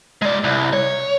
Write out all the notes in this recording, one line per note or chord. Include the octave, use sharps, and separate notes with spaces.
G#3 D5
C2
C#5